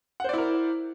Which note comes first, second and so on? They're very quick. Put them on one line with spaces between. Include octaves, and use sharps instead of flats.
F#5 C5 D5 E4 A#4